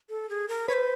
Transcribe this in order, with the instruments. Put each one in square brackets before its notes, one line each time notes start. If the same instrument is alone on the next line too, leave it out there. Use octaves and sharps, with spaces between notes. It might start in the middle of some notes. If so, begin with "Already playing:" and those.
[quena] A4
G#4
A#4
[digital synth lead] B4 [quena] C#5
[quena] C5